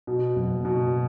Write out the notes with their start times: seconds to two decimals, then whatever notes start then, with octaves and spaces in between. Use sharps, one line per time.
0.07 B2
0.36 F#1
0.65 B2